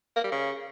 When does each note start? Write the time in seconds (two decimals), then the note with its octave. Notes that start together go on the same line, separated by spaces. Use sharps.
0.16 A#3
0.24 G3
0.32 C#3